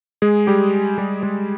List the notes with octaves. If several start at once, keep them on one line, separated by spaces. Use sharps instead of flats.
G#3 G#4
G3 G4
G3 G4
G#3 G#4